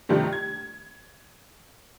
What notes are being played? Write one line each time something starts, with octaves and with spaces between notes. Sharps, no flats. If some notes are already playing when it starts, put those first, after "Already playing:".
G2 C3 D#3 F3 G3 A3
G#6